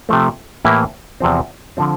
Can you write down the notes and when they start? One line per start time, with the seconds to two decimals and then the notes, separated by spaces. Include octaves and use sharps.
0.09 C3 F3 A3
0.65 A2 E3 A#3 E4 G4
1.20 E2 C3 F3 C4
1.77 D3 F3 C4